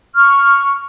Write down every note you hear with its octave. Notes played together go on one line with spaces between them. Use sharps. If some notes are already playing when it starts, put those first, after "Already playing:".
C#6 F6